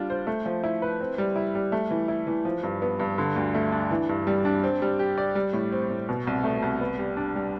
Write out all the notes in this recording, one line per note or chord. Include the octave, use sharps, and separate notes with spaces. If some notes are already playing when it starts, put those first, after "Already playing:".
Already playing: G3 D4 F4
C5
A3
F3
E4
B4
C4
G3
E4
G3
A3
E3
E4
E3
F3
G2
B3
G2
D3
D2
A3
D4
E3
G2
G3
D4
C4
G3
G4
D5
G3
A2
C4
A2
B2
C2
A3
C2
B3
G3
D4
G3